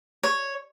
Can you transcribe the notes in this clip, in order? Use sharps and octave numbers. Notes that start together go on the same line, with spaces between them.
C#5